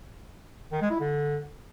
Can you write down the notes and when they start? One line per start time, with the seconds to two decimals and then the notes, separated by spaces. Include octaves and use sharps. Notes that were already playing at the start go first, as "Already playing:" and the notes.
0.72 D#3
0.82 G#3
0.91 E4
1.00 D3